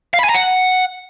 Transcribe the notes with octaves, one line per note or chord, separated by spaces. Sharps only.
F5
B5
G#5
A#5
F#5